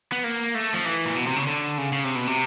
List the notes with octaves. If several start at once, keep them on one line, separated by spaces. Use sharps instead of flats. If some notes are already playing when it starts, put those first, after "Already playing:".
B3
A#3
A3
F3
E3
A#2
B2
C3
C#3
D3
C#3
C#3
C3
B2
C3